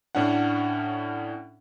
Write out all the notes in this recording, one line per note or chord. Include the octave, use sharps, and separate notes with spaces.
A2 C#4 D4 F#5